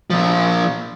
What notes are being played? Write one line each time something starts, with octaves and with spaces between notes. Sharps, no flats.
A#2 F3